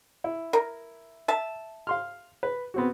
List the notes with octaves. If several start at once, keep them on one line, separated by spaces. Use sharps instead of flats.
E4
A#4
E5 A5
F5 C6 F6
B4
B3 C4 F#4